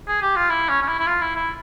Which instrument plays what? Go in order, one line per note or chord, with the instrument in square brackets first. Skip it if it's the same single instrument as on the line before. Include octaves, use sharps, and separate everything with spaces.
[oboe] G#4
G4
F4
E4
C#4
C#4
E4
E4
F4
E4
E4